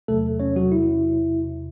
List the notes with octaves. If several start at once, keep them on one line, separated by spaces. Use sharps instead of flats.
E2 C3 F#3 A3 A4
C#4 C#5
F#3 F#4
E4